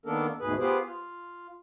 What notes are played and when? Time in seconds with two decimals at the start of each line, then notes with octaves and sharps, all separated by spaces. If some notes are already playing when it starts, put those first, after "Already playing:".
0.06 D#3 A#3 B3 D4 A4 A#4
0.40 D2 G#2 B2 G#4 B4
0.60 B3 F4 G4 G#4 B4 C5
0.86 F4